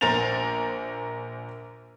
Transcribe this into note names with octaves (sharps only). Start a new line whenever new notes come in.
A#1 A#4 C5 A6 F7